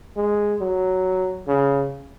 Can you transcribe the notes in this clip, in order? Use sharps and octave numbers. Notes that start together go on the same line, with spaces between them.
G#3
F#3
C#3